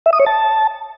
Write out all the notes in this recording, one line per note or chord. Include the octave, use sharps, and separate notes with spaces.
E5
D#6
C#5
A5